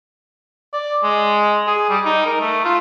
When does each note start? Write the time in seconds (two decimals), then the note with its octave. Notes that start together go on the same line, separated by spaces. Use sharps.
0.73 D5
1.03 G#3
1.67 G#4
1.90 G3
2.05 D#4
2.26 A#4
2.40 A3
2.65 F4